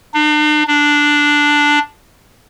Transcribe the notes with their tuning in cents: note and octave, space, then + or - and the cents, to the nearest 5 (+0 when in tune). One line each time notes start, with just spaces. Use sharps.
D4 +45
D4 +0